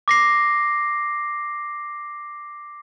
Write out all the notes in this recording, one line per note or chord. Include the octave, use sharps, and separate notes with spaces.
D6 A#6 C7